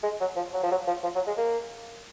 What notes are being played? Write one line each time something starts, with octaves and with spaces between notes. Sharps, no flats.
G#3
F#3
F3
F#3
F3
F#3
F3
F3
F#3
G#3
A#3